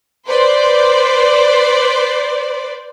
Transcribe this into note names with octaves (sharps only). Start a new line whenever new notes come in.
B4 C5 D5